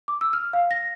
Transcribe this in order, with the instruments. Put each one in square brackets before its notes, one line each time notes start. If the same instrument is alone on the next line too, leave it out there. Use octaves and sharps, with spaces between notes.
[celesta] D6
E6
F6
F5
A#6